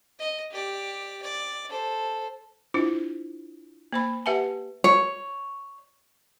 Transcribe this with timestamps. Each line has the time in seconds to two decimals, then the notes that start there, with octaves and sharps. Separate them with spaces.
0.19 D#5
0.51 G4 D5
1.22 D5
1.69 A4 C5
2.74 D4 E4 F4 C5
3.92 A#3 C5 B5
4.26 G4 B4 E5 F#5 G#5 A5
4.84 C#5